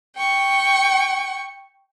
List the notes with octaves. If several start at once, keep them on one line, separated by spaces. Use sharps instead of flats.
G5 C#6